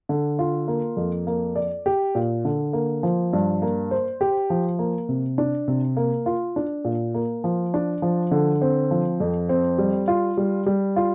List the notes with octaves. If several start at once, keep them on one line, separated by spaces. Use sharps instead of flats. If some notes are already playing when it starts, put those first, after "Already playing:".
D3
F4
A#3
F2
A#3
D5
G4
A#2
D3
A#3
F3
G2
A#3
C5
G4
F3
A#3
C3
D4
C3
A#3
F4
D4
A#2
A#3
F3
D4
F3
D3
C4
F3
F2
C4
G3
F4
G3
G3
F4